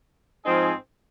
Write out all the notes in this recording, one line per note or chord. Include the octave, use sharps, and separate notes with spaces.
G#2 F3 C4 D#4 G#4